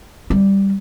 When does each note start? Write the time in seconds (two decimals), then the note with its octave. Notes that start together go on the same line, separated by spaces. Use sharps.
0.30 G3